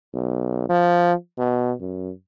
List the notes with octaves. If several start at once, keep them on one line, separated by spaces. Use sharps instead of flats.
B1
F3
B2
F#2